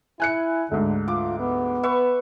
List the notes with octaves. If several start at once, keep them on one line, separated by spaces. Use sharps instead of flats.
E4 G#5 F#6 C#7
D2 G#2 D3
F4 D6
B3
B4 E5 C#6